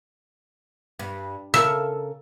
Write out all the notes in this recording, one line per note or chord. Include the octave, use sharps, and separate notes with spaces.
G2
C#3 A4 A#4 E5